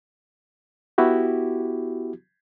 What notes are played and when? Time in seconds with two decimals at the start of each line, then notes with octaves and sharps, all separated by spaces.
0.98 B3 E4 F#4 G4